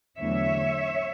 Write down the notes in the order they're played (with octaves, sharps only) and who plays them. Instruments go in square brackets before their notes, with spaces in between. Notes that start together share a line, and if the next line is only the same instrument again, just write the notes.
[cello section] E2 D3 F#3 A3 C#5 E5